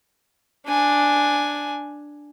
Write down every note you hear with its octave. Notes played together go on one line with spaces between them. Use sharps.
D4 G#5